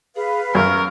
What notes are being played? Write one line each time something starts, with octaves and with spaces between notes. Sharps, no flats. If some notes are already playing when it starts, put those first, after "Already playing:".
G#4 B4 F5
F#2 A#4 C#6